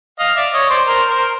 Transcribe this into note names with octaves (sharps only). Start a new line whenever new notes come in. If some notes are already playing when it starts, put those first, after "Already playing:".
D#5 F5
D5 E5
C#5 D#5
C5 D5
A#4 C5
A#4 C5